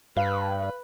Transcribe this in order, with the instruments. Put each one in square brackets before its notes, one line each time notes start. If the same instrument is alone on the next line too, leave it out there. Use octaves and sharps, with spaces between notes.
[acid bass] G2 [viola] B4 [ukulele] F5